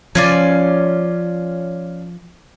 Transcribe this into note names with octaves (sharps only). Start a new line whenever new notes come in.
F3 C#4 F4 D5